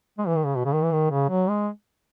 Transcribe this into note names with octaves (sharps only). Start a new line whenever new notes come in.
G#3
E3
D#3
C#3
B2
C#3
D#3
E3
D#3
C#3
F#3
G#3